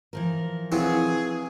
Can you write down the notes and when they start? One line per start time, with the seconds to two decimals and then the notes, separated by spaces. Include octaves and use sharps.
0.13 E3 F3 A#4
0.72 C3 F#3 E4 F4 G#4 B4